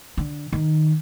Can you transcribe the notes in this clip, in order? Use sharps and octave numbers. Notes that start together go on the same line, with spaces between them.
D3
D#3